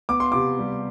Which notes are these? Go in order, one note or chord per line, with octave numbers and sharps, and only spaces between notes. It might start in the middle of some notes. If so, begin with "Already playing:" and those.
B3 D6
C6
C3 D6
G3